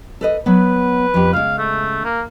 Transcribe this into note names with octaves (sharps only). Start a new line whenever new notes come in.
A4 B4 D#5
F#3 B3 B4
F2 G4
C#3 G#3 F5
A3
A#3